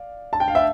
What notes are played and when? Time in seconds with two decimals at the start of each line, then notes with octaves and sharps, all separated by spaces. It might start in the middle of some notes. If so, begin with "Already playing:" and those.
Already playing: D5 F5
0.33 A5
0.40 G5
0.48 F5
0.55 E5